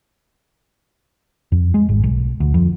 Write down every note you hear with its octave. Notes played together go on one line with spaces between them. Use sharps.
F2
G#3
G#1
B1
D2
F2